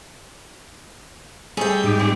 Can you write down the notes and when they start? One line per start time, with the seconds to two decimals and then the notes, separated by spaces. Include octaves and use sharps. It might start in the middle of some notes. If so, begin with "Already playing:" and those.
1.57 G3 A3 G#4 G5
1.84 G#2 D#4 G4
1.99 A#2 C4